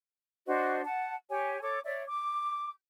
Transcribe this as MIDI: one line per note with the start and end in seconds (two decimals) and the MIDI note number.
0.46 0.82 62
0.46 0.82 66
0.46 0.82 72
0.46 0.82 75
0.84 1.14 78
0.84 1.14 81
1.29 1.60 67
1.29 1.60 73
1.29 1.60 80
1.62 1.79 69
1.62 1.79 73
1.62 1.79 86
1.85 2.03 73
1.85 2.03 74
1.85 2.03 76
2.06 2.69 86